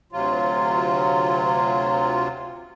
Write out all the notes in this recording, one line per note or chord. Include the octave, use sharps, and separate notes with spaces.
D2 C3 F#3 F4